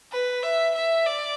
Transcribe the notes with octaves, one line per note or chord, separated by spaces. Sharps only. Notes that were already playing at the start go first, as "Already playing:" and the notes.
B4
E5
E5
D5